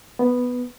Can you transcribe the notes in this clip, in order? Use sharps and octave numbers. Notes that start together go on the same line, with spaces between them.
B3